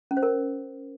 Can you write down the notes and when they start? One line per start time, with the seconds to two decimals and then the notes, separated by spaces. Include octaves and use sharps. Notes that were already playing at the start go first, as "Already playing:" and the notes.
0.11 C#4
0.17 C5
0.23 A#4